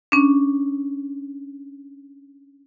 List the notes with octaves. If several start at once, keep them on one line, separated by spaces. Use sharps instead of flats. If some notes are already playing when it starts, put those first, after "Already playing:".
C#4 D4